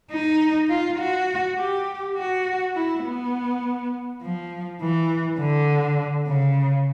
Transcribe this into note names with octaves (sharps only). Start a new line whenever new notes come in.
D#4
F4
F#4
G4
F#4
E4
B3
F3
E3
D3
C#3